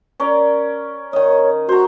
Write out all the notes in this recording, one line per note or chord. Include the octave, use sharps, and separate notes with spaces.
C#4 A#4 D5
D#3 C#5 D#5
F#4 C5 A#5